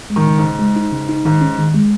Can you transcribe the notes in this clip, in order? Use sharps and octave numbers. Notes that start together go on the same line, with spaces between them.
G#3
D#3
C#3
G#2
C#3
G#3
D#4
C#3
D#4
G#2 D#3
C#4
D#3
G#3